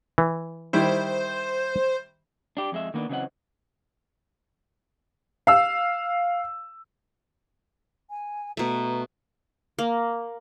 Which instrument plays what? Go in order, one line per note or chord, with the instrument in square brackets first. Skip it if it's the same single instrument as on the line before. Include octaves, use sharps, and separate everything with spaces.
[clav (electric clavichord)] E3
[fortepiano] D#3 G3 E4 [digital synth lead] C5
[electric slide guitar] D4 G4
F2 G#3 E5
D#3 A#3 B3 D4
C#3 E3 F#3 C4 D#5 F#5
[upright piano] F5 E6
[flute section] G#5
[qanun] B2 A3 [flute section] B4 A#5
[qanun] A#3